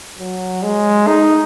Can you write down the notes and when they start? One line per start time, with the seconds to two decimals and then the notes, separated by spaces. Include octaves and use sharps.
0.18 F#3
0.63 G#3
1.07 D#4